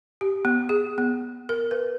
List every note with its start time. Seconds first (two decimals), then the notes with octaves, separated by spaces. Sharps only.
0.21 G4
0.45 B3
0.69 G#4
0.98 B3
1.49 A#4
1.71 B4